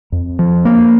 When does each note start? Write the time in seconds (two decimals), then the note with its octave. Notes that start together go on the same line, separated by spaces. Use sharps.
0.12 F2
0.39 F3
0.65 A#3